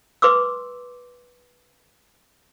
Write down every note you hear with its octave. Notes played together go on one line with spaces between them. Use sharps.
B4 C6 D6 E6